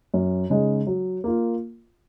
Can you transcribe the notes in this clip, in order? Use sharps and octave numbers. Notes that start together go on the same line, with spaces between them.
F#2
C#3 G#3 D#4
F#3
A#3 F4